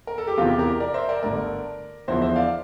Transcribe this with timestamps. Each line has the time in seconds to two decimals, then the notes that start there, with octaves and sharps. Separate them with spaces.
0.07 A#4
0.18 A4
0.27 G4
0.37 E2 C3 E3 F4
0.48 E4 G4
0.59 G4 A#4
0.80 A#4 D5
0.94 C5 E5
1.09 A#4 D5
1.23 G1 G2 D3 A3 A#4 D5
2.08 E2 D3 F3 A#3 E4 C5 E5
2.22 C5 E5
2.36 D5 F5